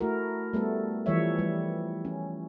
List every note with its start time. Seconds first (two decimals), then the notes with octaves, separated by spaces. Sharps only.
0.01 A3 E4 F#4 A#4
0.53 G3 A3 B3 A4
1.06 E3 F3 G3 C#5 E5
1.39 G3
2.05 C#4